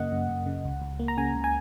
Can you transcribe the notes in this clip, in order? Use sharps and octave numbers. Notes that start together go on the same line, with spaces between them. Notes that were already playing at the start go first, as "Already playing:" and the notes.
Already playing: F#2 C#3 A#3 D#5 F#5
F#2
F#2
C#3
C#2
C#2
A#3
A#5
C#3 G#5
C#2
G#5